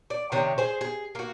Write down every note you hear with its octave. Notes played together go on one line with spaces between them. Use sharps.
D5
C3 D#3 D4 C#5
G#4 C5
G#4
A#3 F#4